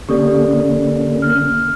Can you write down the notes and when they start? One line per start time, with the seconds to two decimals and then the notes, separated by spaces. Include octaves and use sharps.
0.09 D3 A#3 C#4 G4 A4 D5
1.22 F6